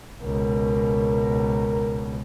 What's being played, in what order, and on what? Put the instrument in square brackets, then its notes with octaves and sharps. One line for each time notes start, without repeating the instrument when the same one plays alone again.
[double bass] C#2 B2 [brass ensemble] A#4